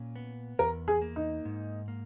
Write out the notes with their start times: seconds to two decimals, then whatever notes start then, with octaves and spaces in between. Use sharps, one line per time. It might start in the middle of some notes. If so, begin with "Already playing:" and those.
Already playing: A#2 C#4
0.16 B3
0.59 E2 A#4
0.88 G#4
1.02 A#3
1.16 D#4
1.45 G#2
1.88 A#3